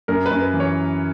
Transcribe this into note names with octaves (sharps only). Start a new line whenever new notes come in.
F#2 A#4
B4
F#2
B4
E3
C#5